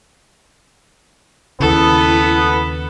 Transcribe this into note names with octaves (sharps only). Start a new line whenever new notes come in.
D#2 C#3 B3 E4 A4